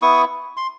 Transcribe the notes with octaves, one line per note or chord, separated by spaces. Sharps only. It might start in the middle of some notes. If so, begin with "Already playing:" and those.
B3 E4 C#6 D#6
C6